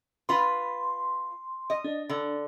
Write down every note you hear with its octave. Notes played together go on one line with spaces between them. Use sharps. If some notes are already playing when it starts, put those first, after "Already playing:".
F4 B4 C6
D#5
D4
D3